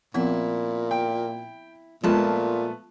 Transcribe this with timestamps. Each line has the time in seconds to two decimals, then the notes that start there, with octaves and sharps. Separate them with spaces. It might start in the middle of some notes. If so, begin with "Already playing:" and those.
0.14 A#2 F3 B3 C4 E4
0.91 G5
2.04 A#2 F3 G#3 A3 B3 F4 A5